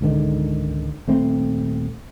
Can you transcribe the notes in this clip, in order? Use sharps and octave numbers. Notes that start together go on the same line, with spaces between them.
C#2 G#2 D3 D#3
D#1 A3 C4